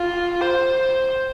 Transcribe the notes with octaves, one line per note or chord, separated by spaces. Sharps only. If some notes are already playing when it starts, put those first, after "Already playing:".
Already playing: F4
C5